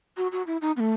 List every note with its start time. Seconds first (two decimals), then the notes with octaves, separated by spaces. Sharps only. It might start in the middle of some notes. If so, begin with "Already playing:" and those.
0.17 F#4
0.32 F#4
0.47 E4
0.62 D#4
0.77 B3
0.80 A3